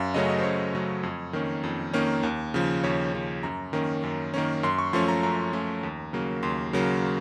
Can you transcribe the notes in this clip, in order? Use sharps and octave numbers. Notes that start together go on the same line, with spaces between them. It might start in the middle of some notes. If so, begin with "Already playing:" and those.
Already playing: F#2 F5
C#3 F#3 A3 C#4 D#5
D#5
C5
F#2 C#5
C#3 F#3 A3 C#4
F2
D#3 A#3 C#4
F2
D#3 A#3 C#4
D#2
C#3 F3
D#2 C#5
C#3 F3
F#2 A#5
D#3 A#3 C#4
F#2
D#3 A#3 C#4
F#2 C6
C#6
F3 A3 C#4 C6
A#5
F#2 A#5
F3 A3 C#4
D#2
C#3 F#3 A#3
D#2 C6
C#3 F#3 A#3